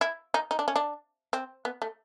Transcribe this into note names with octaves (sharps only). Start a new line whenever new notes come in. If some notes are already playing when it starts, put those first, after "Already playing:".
E4
D#4
D#4
D4
C#4
D4
C4
B3
A3